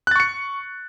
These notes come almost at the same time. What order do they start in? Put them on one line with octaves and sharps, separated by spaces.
F#6 A6 C#6 C#7